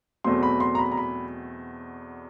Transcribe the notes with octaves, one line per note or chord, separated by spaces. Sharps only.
E2 B2 F#3 A3 C4 C6
B5
C6
A#5
B5
A#5
B5